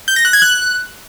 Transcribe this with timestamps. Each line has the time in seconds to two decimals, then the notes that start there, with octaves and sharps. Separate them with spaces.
0.08 G6
0.16 A#6
0.25 F#6
0.33 G#6
0.42 F#6